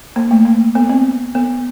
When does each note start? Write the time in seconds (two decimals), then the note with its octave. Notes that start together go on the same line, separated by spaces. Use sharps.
0.16 A#3
0.31 A3
0.45 A#3
0.75 B3
0.89 C4
1.35 B3